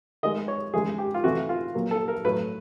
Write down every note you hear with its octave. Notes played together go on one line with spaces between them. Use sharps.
D#3 G#3 D#5
C#5
C#3 E3 G#3 G#4
G4
F4
C3 E3 A3 F#4
F4
A#2 F#3 A#3
A4
A#4
A2 F#3 A3 B4